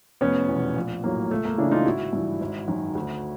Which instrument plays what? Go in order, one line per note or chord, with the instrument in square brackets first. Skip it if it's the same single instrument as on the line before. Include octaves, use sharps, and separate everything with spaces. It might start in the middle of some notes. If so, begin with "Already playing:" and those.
[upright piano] F1 B3 C#4
E2 B2
A#1
A2 F#3 A#3
C#2 A3
A#3
C#3 E3 D4 E4
D#4 F4
G#1 E4 F#4
G2 E3
G#1
F#2 D#3 F#3
D2